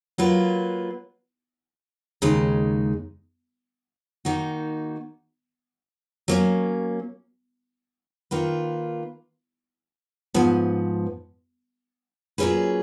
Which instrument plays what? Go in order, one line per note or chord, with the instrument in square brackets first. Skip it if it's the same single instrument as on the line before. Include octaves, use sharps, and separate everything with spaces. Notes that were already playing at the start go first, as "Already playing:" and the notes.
[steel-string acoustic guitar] F#3 A#3 F4 B4
D#2 C#3 G#3 D#4
D#3 A#3 D#4 F#4
F#3 A#3 C#4
D#3 A#3 F4 B4
G#2 F3 B3
A#2 F#3 C#4 G#4 B4